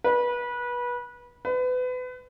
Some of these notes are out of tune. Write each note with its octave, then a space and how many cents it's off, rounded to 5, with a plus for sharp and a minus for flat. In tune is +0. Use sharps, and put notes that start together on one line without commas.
B4 -25
B4 +30